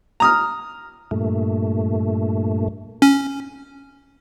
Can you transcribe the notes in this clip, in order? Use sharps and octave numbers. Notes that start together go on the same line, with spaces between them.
A#5 D#6 F6
G2 A#2 A3
C#4